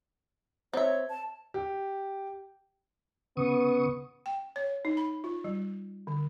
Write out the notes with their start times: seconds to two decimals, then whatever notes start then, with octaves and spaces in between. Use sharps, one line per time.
0.73 C4 C#5 E5
1.10 A5
1.54 G4
3.37 C#3 B3 C#6 D#6
4.26 G5
4.56 C#5
4.85 D#4
4.97 B5
5.24 F4
5.44 G3
6.07 D3